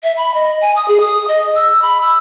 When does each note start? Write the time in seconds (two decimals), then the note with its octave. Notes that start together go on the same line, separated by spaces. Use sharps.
0.03 E5
0.17 B5
0.35 D#5
0.61 G#5
0.76 D#6
0.88 G#4
1.00 D#6
1.28 D#5
1.55 E6
1.82 B5
2.01 E6